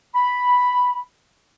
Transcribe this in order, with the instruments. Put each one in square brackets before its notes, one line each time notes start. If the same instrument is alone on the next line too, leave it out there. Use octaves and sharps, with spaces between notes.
[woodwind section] B5